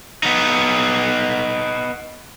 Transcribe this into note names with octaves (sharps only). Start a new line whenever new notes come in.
B3 D#4